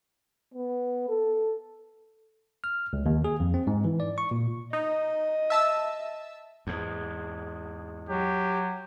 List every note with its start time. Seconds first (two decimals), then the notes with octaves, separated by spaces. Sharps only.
0.54 B3
1.08 A4
2.64 F6
2.93 C#2
3.06 D#2
3.24 G#4
3.40 F2
3.54 C4
3.67 G#2
3.84 E3
4.00 D5
4.18 C#6
4.31 A#2
4.73 D#4 D#5
5.50 E5 A5 E6
6.67 E2 G#2
8.09 F#3 G4